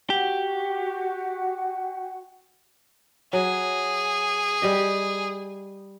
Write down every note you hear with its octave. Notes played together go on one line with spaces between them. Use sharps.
F#4 G4 F#5
F#3 G#4
G3 G4 D#5